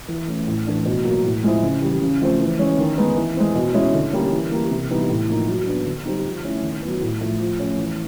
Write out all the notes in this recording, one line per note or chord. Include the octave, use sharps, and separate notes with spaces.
E3
A3 C#4 E4
A2
E3 A3 D4
B2
F#3 A#3
A2
F3 G#3 C4 E4
C#3
E3 G3
C#3
F3 A3 C4
E3
G#3 C#4
D#3
G#3 B3 D#4
E3
G#3 C4
B2
G#3 C#4 E4
D3
G3 A#3 C#4
E3
G3 A#3
C3
E3 G3 B3 D#4
A2
F3 A#3 D#4
F#3
B3 D4
D3
G3 C4 D#4
F3
A3 C#4 E4
D#3
F#3 B3
A2
F3 A3
F3
A3 C#4
E3